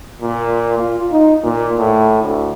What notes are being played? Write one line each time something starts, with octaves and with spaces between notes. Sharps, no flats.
A#2
F4
D#4
A#2
A2
D2